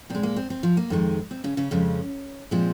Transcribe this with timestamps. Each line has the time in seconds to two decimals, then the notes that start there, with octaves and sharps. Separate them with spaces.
0.10 A#2 G#3 C4
0.23 A#3
0.36 C4
0.50 C4
0.63 F3 F4
0.77 A#3
0.90 F2 D#3 G#3
1.31 C4
1.44 C#3 C#4
1.57 C#3 C#4
1.71 F2 C#3 G#3
2.51 A#2 F3 G#3 C4